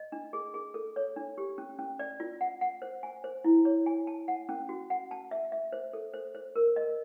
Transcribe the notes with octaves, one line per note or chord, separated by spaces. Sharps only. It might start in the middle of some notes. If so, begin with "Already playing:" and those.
Already playing: D#5
D4
G#4
G#4
A4
C#5
D4
G4
C#4
C#4
D5
F4
F#5
F#5
C5
G#5
C5
E4
C#5
G#5
A5
F#5
C#4
F#4
F#5
A5
E5
E5
C5
A4
C5
C5
A#4
D#5